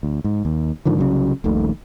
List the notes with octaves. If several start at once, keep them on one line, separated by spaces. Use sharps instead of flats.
D2
G#2
D#2
G#2 D3 D#3 F3
C2 C#3 F#3
D#1 A#1 D#3 A3